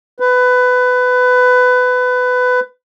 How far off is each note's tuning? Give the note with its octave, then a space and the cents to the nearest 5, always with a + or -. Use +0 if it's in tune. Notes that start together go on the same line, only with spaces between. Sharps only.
B4 +20